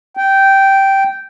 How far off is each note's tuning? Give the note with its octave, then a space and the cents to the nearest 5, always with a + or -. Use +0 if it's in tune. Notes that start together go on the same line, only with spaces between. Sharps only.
G5 -10